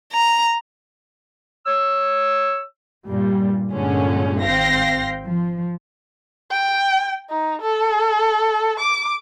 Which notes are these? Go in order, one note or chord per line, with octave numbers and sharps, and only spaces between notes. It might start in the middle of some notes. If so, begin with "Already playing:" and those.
A#5
C#5 E6
G2 A#2 G3
G2 A#2 D3 G#3 C#4
G#1 C4 F5 G5 A#6 C7
F3
G5
D#4
A4
D6